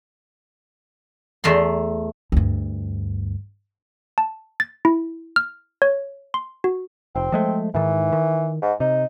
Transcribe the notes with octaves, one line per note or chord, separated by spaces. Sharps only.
E2 A3 A#5 C6
D2 G2
A5
A6
E4
F6
C#5
C6
F#4
F1 C4
F3 G#3 A3
G#2 D#3 E3
D#3
G#2
C3 D#4